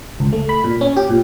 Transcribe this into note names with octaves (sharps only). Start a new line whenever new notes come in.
C#2
A3
B5
A#2
C#4
G4
A#2